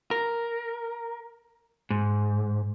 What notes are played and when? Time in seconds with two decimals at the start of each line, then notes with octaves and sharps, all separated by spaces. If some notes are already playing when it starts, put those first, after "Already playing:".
0.11 A#4
1.90 G#2